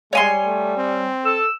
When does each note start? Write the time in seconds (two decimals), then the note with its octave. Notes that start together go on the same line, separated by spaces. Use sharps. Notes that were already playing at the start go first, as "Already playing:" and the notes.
0.13 G3 G#3 C#5 G#5 C6
0.46 A3
0.77 C4
1.25 A4 E6